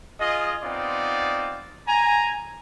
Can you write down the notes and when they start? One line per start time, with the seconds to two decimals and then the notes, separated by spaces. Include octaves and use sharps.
0.19 F4 G#4 D#5
0.62 B3 C4 D#4 F4 D5
1.87 G#5 A#5